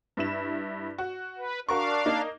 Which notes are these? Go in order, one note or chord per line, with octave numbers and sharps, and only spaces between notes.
G2 E4 E7
F#4
B4
D4 F#4 A#4 F5 C#6
A#3 D#4